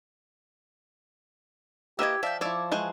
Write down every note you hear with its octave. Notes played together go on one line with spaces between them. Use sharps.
A#3 E4 G4 B4 D#5 E6
F3 D5 E5 F5 G5
F3 E4 C#5 D5 D6 E6
E3 G#3 C5 C#6 F#6